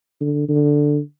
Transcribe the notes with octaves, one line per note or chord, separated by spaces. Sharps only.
D3
D3